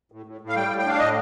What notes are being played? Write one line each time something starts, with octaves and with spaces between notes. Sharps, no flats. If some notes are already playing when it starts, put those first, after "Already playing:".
A2
A2
A2
F5
G3 G5
A2
G5
D4 F5
A2 D#5